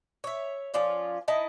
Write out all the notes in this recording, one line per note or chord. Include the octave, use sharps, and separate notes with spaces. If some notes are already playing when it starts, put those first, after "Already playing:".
C#5 E5
F3 C#4 F4 D5
D#4 E4 D#5 A5